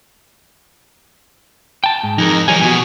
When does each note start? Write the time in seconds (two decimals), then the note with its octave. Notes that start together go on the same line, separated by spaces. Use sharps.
1.84 G5 A5
2.03 G#2
2.18 F2 D#4 G#4 A#4
2.48 E3 G3 C#5 D#5 G#5
2.60 B2 F#4 G#5